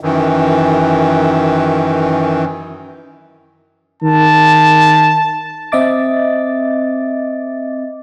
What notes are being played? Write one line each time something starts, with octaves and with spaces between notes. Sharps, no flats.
F#2 D#3 E3
D#3 A5
C4 D#5 E5 D6 A6